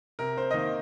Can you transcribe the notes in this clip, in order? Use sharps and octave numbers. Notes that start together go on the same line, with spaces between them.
C3 A#4
C5
D#5
D#3 A#3 C5